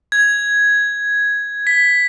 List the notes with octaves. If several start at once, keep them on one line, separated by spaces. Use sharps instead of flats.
G#6
B6